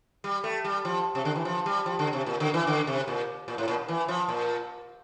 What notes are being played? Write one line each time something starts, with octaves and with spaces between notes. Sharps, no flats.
G3
A3
G3
F3
C3
D3
E3
F3
G3
F3
D3
C3
A#2
D3
E3
D3
C3
A#2
A#2
A2
A#2
E3
F3
A#2